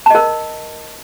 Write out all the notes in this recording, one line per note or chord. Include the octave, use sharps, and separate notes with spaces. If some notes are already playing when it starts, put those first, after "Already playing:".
A#4 D#5 A5